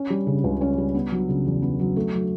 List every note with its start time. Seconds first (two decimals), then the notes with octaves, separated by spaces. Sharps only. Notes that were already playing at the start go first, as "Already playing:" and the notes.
Already playing: C#4
0.10 G3
0.27 C#3
0.44 C#2
0.61 C#4
0.78 G3
0.95 B3
1.12 F#3
1.29 C#3
1.46 E2
1.62 B3
1.79 F#3
1.96 A3
2.13 F#3